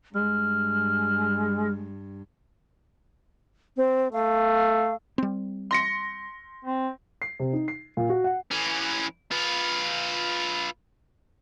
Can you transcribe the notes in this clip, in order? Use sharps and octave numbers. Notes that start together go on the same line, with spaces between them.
G2 G#3 F6
C4
A3 F5
G3 C4
C6 A#6 C#7
C4
C7
C3
D#4
C7
A#2
F#4
F#5
E3 C#4
F4 B4